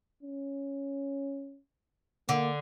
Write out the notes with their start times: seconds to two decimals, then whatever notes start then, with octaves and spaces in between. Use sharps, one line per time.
0.23 C#4
2.29 D3 A#3